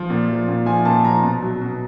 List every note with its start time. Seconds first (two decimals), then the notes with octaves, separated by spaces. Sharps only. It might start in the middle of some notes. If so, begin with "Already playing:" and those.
Already playing: F3
0.10 A#2
0.28 F3
0.48 A#2
0.66 F3 G#5
0.85 A#2 A5
1.05 F3 A#5
1.23 B2
1.42 F#3
1.61 B2